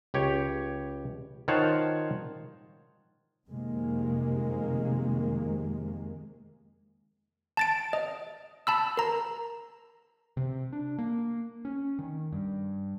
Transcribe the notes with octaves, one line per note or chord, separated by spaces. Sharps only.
C#2 G4 C#5
D#3 F4 C5 C#5 F#5 A5
F2 C3 D#3 G#3 A#3
A5 A6 D7
D#5
A5 B5 E6
A#4 A#5
C3
D4
A#3
C#4
D#3
G2